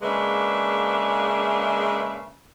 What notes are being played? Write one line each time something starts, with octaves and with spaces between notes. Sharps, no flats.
C#3 G#3 A#3 D4 B4 E5